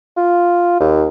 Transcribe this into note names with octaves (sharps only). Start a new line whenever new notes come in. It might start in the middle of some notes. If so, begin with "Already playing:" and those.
F4
D#2